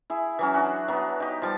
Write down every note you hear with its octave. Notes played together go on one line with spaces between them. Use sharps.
E4 G#4
E3 F#3 C#4
D4 F#4
F#3 B3
D#4 G4
F3 G3 A5